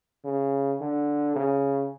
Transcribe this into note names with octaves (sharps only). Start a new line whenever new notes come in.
C#3
D3
C#3